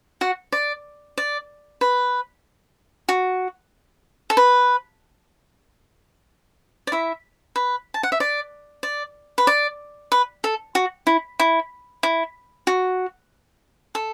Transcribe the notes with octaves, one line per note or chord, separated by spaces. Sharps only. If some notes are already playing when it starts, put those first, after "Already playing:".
F#4 F#5
D5
D5
B4
F#4
A4
B4
D5
E4 E5
B4
A5
F#5
E5
D5
D5
B4
D5
B4
A4
F#4
E4
E4
E4
F#4
A4